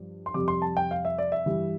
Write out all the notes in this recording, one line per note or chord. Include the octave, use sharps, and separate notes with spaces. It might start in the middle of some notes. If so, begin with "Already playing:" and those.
Already playing: G2 F3
C6
F2 C3 G3 D6
C6
A5
G5
F5
E5
D5
E5
G2 E3 G3